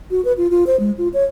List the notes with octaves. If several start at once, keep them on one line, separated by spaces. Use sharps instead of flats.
F#4
B4
F4
F4
C5
G#3
F4
C#5